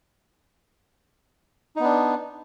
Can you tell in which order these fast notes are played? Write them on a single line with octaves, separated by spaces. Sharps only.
D#4 B3 D4